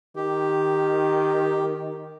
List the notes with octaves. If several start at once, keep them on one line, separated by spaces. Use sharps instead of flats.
D#3 G4